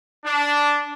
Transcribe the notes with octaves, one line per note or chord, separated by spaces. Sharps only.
D4